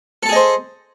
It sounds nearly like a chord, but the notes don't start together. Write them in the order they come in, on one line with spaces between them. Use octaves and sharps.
A4 A5 G#4 D#5 C5